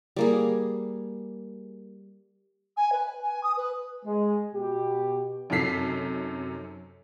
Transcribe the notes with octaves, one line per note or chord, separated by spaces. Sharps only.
G3 A#3 G#4
G#5
B4
G#5
D#6
B4
G#3
B2 G4
F#2 C3 D#4 A4 B6 C7